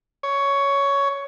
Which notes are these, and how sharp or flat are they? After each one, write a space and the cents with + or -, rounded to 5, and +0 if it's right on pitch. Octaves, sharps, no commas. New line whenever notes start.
C#5 +10